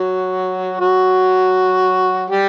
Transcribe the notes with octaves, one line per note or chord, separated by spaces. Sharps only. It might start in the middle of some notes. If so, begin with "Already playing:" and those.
Already playing: F#3 F#4
F#3 F#4
G3 G4